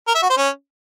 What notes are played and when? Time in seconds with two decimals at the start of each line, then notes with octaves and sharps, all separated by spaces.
0.08 A#4
0.15 E5
0.23 F#4
0.30 C5
0.38 C#4